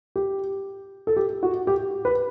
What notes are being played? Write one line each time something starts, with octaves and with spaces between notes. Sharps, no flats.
G4
A4
G4
F#4
G4
B4